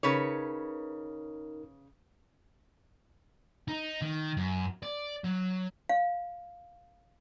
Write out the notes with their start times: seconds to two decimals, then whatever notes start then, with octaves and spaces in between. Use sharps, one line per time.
0.03 C#3 D#4 A#4 B4 C#5
3.68 D#4
4.02 D#3
4.37 F#2
4.83 D5
5.24 F#3
5.89 F5